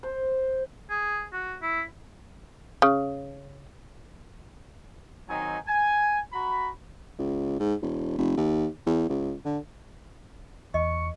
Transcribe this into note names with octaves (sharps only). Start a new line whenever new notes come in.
C5
G#4
F#4
E4
C#3
D#3 F#3 C4 D#4 G#5
G#5
F#4 A#5 B5
C#2
G#2
E1
F1
D#2
E2
C#2
D3
E2 D#5 C#6